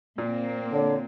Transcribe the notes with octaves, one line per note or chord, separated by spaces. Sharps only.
A#2 A#3 C4
D3 C#5